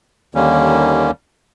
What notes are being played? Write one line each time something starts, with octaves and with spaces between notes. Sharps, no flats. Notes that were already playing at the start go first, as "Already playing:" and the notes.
D#2 D3 D#3 G3 A#3 C#4